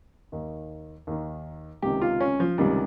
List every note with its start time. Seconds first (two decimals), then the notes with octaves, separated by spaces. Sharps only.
0.32 D#2 D#3
1.07 D#2 D#3
1.82 C#2 C3 D#3 G4
2.01 F4
2.21 C#4
2.40 F3
2.58 C#2 C3 D#3 G3